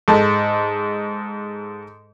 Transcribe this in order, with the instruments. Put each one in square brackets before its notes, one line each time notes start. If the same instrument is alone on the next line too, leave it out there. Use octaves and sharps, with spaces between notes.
[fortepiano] G#2 A4